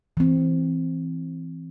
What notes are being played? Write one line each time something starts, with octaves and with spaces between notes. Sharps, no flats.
E3 C4